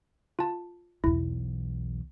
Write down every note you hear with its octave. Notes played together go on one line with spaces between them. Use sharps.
F4 A5
B1 E2 E4